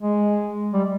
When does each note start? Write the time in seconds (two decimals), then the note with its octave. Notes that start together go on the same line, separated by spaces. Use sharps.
0.01 G#3
0.73 G3